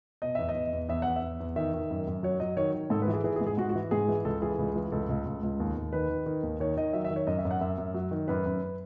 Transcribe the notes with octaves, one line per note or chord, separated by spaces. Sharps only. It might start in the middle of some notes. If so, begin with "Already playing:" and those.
B2 D#5
E2 E5
D#5
E2
E2
E2 E5
E2 F#5
E5
E2
E2
D#3 E5
D#3
F#2
F#2
F#3 C#5
F#3 D#5
D#3 C#5
D#3
G#2 A4
B4
E3
G#4
E3 G#4
G#4
G#2
G#4
G#2 F#4
F#4
E3
G#2 G#4
E3
C#2 A4
E3 G#4
C#2
E3
C#2 A4
C#2
C#2
C#2
D#2
D#2
D#3 B4
D#3
D#3
D#2
D#3 C#5
D#3 D#5
F#3 E5
E5
D#3
C#5
F#2 D#5
E5
F#2
F#5
F#2 E5
F#2
F#3
D#3
F#2 B4
F#2